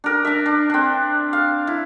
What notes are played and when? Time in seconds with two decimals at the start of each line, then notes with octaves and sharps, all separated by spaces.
0.04 D4 A#4
0.25 D4 E5
0.46 D4
0.70 C4 D4
1.33 F5
1.67 E4